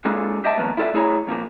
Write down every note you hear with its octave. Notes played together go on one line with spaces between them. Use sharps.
G#3 A#3 D4 F4 G#4 A4
G4 C5 D#5 E5 G5 A5
D#3 F3 A#3 B3
E4 F4 A4 D5 E5
A3 E4 G#4 C#5 A5 A#5
F2 A#2 F3 A#3